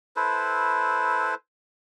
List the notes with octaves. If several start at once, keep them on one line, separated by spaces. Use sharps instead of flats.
E4 A4 B4 C5